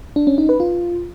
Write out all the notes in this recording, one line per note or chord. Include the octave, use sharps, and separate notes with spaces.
D4
C#4
D#4
B4
F4